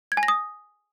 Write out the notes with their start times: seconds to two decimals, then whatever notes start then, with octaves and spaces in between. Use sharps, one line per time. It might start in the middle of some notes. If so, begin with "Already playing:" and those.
0.12 G#6
0.17 G#5
0.23 A#6
0.28 D#6